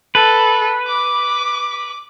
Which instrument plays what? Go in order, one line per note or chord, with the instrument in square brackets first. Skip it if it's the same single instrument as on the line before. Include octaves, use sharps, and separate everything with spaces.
[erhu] A4 [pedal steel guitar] B4
[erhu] D6